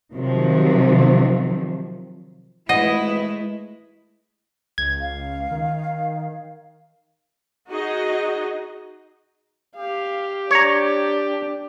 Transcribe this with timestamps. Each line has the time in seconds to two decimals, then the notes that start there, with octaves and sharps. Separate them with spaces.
0.14 C3 D#3 F3 F#3
2.69 G#1 E3 G#3 A3 E4 B4 D#5 F#5
4.78 C#2 G#6
5.00 F5
5.51 D#3
7.69 D#4 F#4 G#4 D#5
9.77 G4 F5
10.51 D4 C#5 A#5